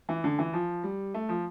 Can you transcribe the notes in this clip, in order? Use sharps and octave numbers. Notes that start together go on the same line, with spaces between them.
E3
D3
E3
F3
G3
A3
F3